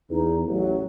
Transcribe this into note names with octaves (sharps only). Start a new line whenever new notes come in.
E2 D#4
A1 F#3